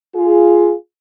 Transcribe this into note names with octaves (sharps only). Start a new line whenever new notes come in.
F4 G#4